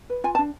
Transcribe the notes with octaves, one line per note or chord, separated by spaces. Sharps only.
B4
F4 G#5
A5
D4